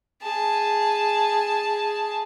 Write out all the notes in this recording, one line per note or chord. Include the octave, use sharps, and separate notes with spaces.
G#4 A5